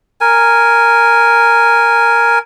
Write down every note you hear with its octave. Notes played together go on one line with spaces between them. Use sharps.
A#4 G#5